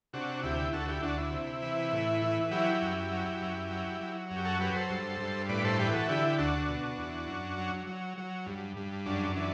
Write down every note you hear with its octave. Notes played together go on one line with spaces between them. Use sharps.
C3 D4 F#4
D2 E4 G4
D2 F#4 A4
E4 G4
D2 D4 F#4
E4
C3
E3
A2
E3
F#3 E4 G4
F#2
F#3
F#2
F#3
F#3
F#2
G4
F#4 A4
F#3 G4 B4
A4 C5
G2
G2
A2 B4 D5
A4 C5
E3 G4 B4
F#4 A4
D3 E4 G4
D2 D4 F#4
B2
E2
F#2
F#3
F#3
F#3
G2
G2
F#2 D4
E3 D4